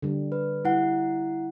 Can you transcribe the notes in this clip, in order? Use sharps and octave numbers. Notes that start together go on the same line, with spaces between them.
D3 G3
B4
G3 E4 F#5